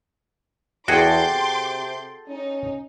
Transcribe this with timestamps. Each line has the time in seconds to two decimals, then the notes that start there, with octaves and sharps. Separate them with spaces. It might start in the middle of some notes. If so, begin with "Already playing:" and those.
0.88 E2 F#4 G#4 A4 G5 C6 D6 G6
1.31 C3
2.29 C#4 D#4